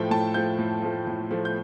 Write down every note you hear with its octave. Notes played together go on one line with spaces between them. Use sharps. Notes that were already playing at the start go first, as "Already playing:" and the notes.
Already playing: A2 F3 A3 G5
A2 A5
F3 A3 G6
A2
F3 A3
A2
F3 A3
G6